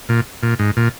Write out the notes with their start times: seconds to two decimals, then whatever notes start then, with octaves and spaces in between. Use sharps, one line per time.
0.09 A#2
0.43 A#2
0.59 G#2
0.77 A#2